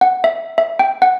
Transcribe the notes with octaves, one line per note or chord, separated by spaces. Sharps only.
F#5
E5
E5
G5
F#5